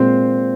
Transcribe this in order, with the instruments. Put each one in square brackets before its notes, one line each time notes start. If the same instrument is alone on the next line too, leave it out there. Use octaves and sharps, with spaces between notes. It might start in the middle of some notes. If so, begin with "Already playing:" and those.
Already playing: [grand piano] A#2 G#3 C4 C5